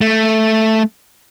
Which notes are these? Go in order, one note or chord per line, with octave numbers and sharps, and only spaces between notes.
A3